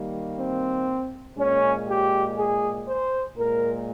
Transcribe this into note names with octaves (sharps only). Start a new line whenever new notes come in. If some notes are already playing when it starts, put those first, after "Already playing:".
Already playing: D#3 G3 A#3
C4
A#2 G#3 C#4
G4
G#4
C5
A#2 G#3 A#4